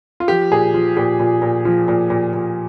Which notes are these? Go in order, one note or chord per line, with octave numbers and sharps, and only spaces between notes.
F4
F3 G4
A#2 G#4
F3
A#2 G4
A#2
A#2
F3
A#2
A#2
A#2